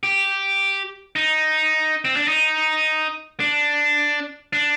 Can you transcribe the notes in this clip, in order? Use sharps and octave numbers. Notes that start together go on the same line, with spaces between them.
G4
D#4
C4
D4
D#4
D4
D4